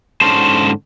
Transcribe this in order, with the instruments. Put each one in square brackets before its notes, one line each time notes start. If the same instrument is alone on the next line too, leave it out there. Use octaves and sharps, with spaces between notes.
[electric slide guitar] G#2 D3 C#4 C5 A5